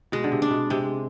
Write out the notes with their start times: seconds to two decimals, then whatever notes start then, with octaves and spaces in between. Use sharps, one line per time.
0.12 B2 G#3
0.24 D3
0.32 C3
0.42 D4
0.50 B2
0.70 C3 G#3